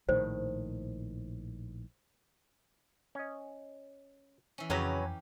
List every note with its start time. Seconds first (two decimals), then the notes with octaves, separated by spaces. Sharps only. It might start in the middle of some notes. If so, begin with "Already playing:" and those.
0.09 A#1 A2 D#3 C5
3.15 C#4 D#5
4.58 E3 C#4
4.70 F2 C#3 F#3 C#4 G4 B4 A#5